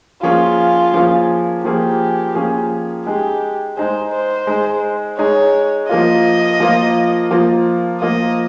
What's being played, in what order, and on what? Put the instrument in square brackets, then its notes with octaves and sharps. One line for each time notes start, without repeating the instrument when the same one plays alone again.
[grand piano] F3 A#3 C#4 G#4 [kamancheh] F4
[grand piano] F3 A#3 C#4 G#4
[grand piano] F3 A#3 C#4 G#4 [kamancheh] G4
[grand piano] F3 A#3 C#4 G#4
[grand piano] G#3 D#4 G#4 [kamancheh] G4
[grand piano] G#3 D#4 G#4 [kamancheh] C5
[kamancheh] C5
[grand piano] G#3 D#4 G#4
[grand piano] G#3 D#4 G#4 [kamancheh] C#5
[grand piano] F3 A#3 F4 [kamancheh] D#5
[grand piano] F3 A#3 F4
F3 A#3 F4
[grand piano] F3 A#3 F4 [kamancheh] D#5